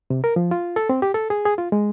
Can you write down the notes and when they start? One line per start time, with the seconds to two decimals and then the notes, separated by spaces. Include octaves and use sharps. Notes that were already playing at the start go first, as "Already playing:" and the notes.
0.10 C3
0.24 A#4
0.36 F3
0.51 F4
0.76 A4
0.89 C4
1.02 G4
1.14 A4
1.30 G#4
1.46 G#4
1.58 F4
1.72 G#3